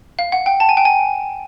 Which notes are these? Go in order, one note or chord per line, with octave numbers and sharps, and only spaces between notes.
F5
F#5
G5
A5
G#5
G5
G#5